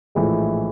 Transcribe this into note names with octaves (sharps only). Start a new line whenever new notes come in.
A#1 A2 E3 G#3